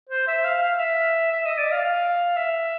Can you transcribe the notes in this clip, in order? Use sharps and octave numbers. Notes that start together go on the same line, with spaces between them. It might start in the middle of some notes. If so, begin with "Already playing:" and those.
C5
E5
F5
F5
E5
E5
D#5
D5
F5
F5
E5